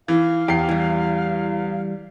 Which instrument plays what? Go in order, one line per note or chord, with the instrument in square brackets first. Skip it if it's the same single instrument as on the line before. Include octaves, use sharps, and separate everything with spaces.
[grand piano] E3 [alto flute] F5
[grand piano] E2 C7 [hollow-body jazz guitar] G4
[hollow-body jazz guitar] E3 G3